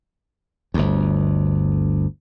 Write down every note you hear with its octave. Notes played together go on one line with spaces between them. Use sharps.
G1 D2